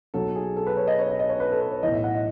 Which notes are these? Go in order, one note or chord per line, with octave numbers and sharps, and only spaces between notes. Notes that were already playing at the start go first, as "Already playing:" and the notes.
B1 B2 F#3 A4
G#4
A4
B4
C#5
D#5
C#5
D#5
D#5
C#5
B4
A4
B4
C#5
B1 A2 E3 D#5
E5
F#5
D#5